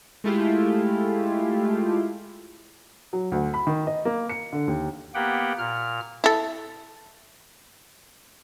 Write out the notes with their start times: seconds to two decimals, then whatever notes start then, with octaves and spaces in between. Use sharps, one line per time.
0.24 G#3 A3 E4 F4 G4
3.13 F#3
3.32 D2
3.54 B5
3.67 D#3
3.87 D#5
4.05 A#3
4.30 C#7
4.53 D3
4.68 D#2
5.15 A#3 B3 G4 F#5 G5
5.58 A#2 F6
6.24 E4 A4